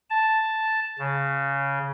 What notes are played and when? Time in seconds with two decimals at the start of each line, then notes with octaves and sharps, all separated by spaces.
0.10 A5
0.99 C#3